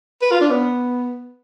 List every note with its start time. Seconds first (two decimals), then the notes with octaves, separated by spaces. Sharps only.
0.22 B4
0.31 F4
0.41 D4
0.50 B3